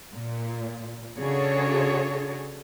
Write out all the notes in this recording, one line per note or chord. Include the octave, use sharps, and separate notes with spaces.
A#2
C#3 D4 F#4 G#4 A4 C#5